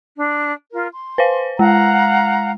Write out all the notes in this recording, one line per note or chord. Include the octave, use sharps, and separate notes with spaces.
D4
F4 A#4
C6
B4 C5 F5
G#3 F5 F#5 A#5